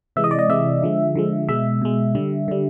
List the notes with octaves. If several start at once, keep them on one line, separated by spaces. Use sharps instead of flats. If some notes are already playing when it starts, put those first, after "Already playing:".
C3 E3 G#3 E5
D#5
D5
D#5
C3 E3 G#3 E5
D3 F3 G#3
D3 F3 G#3
B2 G#3 E5
B2 G#3
D3 G3
D3 G3